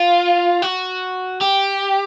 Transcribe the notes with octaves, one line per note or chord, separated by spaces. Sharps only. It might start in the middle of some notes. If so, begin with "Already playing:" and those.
Already playing: F4
F#4
G4